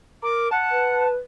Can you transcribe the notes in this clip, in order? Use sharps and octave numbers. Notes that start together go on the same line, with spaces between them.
A#4 D6
F#5 A5
B4